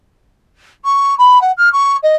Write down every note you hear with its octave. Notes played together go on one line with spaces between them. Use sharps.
C#6
B5
F#5
F6
C#6
D#5